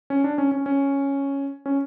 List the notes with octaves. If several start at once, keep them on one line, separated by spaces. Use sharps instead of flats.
C#4
D4
C#4
C#4
C#4
C#4